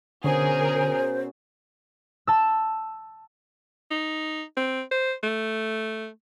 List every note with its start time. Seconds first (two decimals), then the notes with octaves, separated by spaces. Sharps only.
0.24 B2 D3 C#4 G#4 A#4 C5
2.27 A5 E6
3.91 D#4
4.57 C4
4.92 C5
5.24 A3